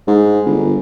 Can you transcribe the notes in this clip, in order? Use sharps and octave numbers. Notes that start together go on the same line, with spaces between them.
G#2
G1